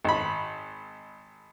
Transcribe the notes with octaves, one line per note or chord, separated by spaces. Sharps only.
G#1 B5